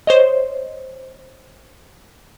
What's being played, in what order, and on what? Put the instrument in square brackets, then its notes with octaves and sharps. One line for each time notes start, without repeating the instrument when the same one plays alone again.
[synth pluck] C5 C#5 D#5